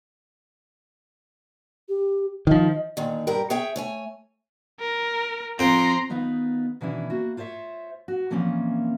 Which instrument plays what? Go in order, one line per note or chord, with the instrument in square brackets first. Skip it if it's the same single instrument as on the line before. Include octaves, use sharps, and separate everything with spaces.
[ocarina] G4
[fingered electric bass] D#3 F3 [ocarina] D#5
[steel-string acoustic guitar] A#2 D3 D#3
G2 G4 A#4
G#4 C#5 E5 G5
A3 C#5 G#5
[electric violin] A#4
[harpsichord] F2 G5 [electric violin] A#5 C6
[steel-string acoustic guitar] D#3 B3 D#4 F4 B4
B2 D#3 E3 C#4 D4 E4
A#3 F#4
F4 C5 C#5 D#5 E5
F#4
A#2 E3 F3 A#3 C4 C#4